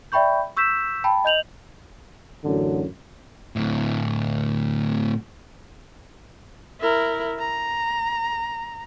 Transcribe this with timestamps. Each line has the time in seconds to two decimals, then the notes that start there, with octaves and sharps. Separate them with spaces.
0.12 D5 E5 G5 B5 C#6 G6
0.57 C#6 E6 G6 B6 E7
1.04 G5 A5 B5
1.24 D#5 G6 F7 F#7
2.44 A1 F#2 D3 F#3
3.56 D2 A2
6.81 E4 A#4
7.39 A#5